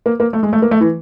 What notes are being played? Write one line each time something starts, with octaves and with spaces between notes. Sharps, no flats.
A#3
A#3
A3
G#3
A3
A#3
A3
E3